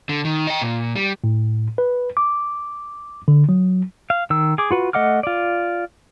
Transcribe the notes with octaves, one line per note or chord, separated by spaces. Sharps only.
D3
D#3
D#5 G5
A#2
G3
A2
B4
D6
D3
F#3
F5
D#3 E6
G#4 D6
F4 F#4 B4
A3 D#5 F#5 D6 F6
F4 D5